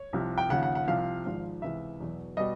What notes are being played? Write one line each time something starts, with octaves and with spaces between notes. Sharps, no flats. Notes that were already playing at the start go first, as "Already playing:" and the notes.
Already playing: C#5
C2 C3 F3
G5
D#2 C#3 F3 F#5
F#5
F#5
C2 C3 F3 F5
G#1 G#2 F3
C#2 C3 E3 E5
E2 B2 F#3
B2 G3 D#5